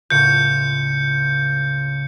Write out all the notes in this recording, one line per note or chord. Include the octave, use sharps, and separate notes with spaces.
C#2 A2 F#5 G6 C#7